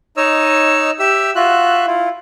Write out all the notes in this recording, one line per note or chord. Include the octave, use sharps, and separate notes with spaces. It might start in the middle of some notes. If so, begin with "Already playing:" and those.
D#4 C#5 D#5 E6
G4 E5 E6
F4 F#4 E5 F#6
E4 F4